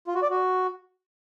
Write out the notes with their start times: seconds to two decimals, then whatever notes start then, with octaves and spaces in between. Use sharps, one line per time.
0.07 F4
0.15 F#4
0.23 D5
0.30 F#4